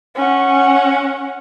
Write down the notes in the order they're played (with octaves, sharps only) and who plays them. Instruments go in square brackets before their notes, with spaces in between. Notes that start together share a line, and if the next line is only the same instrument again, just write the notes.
[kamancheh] C#4 F#5